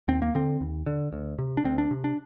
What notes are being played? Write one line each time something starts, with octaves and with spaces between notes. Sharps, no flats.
D#2 C4
A#3
D3 C4
D#2
D3
D2
C3
D4
D2 C4
D4
C3
D4